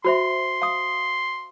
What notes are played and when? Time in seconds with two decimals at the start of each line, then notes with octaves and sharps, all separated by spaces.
0.05 F#4 C5 E5 C6
0.62 F5 D#6